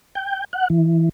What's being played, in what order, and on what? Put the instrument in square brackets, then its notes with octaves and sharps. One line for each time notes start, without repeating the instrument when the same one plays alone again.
[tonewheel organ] G5
F#5
E3